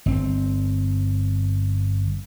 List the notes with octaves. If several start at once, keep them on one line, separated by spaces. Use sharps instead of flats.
G1 C4